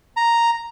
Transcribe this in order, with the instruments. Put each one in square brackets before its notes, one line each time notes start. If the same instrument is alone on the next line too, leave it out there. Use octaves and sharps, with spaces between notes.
[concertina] A#5